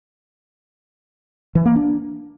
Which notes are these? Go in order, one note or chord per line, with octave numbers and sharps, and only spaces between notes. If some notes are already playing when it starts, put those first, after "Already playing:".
E3
A#3
D4